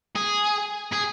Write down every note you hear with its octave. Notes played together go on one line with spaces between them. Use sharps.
G#4
G#4